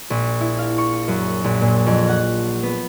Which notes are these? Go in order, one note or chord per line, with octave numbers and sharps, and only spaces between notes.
A#1
E4
F5
C#6
F#2
A#1
A#2
F2
F#5
B3